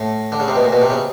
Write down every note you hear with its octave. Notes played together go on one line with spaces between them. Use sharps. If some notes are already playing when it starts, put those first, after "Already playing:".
Already playing: A2
D3
C#3
C3
B2
A#2
B2
C3
C#3